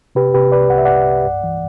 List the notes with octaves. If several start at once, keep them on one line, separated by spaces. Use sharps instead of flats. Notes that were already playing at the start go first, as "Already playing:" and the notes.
C3 G4 B4
C3 G4 B4
C2 B4 D5
C2 F#5
E5
C2 D5 F#5
C2
G2
E3